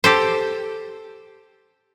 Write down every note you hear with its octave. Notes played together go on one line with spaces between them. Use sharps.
G4 A4 C5